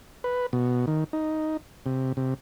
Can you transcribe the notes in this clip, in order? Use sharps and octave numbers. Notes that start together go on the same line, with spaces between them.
B4
B2
D#3
D#4
C3
C3